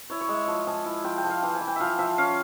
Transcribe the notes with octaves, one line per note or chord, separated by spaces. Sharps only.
E4 C#5
C#5
G#3 E5
F3
F3 G#5
E4
F3 G5
G5
F3
F5
E3 G5
G#5
E3
G5
F3 E5 F5
F3 E5
C#4 F5